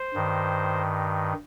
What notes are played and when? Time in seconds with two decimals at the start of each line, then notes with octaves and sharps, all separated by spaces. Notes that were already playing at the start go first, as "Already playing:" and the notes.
Already playing: C5
0.14 G2 D#3